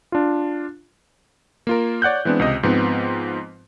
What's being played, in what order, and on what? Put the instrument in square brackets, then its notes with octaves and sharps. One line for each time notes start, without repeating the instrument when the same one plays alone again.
[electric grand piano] D4 F4
A#3 F4 A#4
C#5 D5 F#5 F#6 G6
E3 G#3 B3 C4 D4
C#2 C3 D#5
G#2 F3 B3 C4